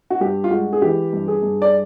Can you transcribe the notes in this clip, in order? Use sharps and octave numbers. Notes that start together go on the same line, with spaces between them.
F#4
G2 G4
F4
G#3 F#4
G#4
E3 G4
G2
G#4
G2
D5